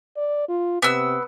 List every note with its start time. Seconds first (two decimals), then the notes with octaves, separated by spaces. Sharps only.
0.17 D5
0.49 F4
0.82 C3 B3 E6